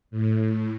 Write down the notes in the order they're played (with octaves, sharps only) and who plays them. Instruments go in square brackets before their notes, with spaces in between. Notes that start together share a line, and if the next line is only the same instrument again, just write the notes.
[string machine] A2